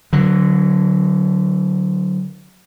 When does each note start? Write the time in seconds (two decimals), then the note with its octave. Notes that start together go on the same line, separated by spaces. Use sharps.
0.13 D3 F#3